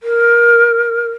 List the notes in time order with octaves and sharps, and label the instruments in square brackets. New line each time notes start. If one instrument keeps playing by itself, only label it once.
[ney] A#4